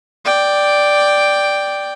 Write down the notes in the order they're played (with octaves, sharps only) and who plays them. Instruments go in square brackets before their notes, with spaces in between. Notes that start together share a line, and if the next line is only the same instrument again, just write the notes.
[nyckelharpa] D5 G5